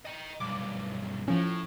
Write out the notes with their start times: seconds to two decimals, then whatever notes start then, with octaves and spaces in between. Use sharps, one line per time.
0.05 D#5 G5
0.40 B1 G2 D6
1.28 A2 F3 C#4